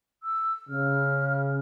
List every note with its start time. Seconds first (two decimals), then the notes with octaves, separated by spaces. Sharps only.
0.23 E6
0.69 C#3 F6